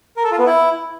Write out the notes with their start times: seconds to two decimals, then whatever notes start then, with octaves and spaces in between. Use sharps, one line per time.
0.17 A#4
0.24 A4
0.31 F4
0.39 B3
0.46 E4